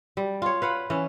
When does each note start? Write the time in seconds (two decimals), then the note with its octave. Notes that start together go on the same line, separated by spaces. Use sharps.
0.17 G3
0.42 F4 C#5
0.62 B4 F5 F#5
0.90 E3 C#4